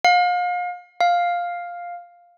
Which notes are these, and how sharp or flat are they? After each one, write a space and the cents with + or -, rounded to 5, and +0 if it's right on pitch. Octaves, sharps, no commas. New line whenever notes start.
F5 +35
F5 +5